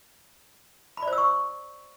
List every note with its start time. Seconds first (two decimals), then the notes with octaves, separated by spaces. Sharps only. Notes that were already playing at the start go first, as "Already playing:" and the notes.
0.97 B5
1.02 D5
1.08 C5
1.13 E6
1.18 C#6